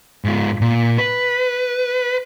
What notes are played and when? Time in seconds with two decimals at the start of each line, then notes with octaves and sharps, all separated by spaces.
0.25 G#2 F4
0.61 A#2
0.98 B4